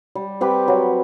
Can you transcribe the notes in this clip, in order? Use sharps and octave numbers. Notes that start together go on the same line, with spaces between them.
G3
C4 G4 B4
F#3